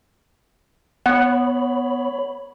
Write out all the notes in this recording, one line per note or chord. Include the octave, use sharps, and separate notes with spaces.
B3 C#5 F#5 B5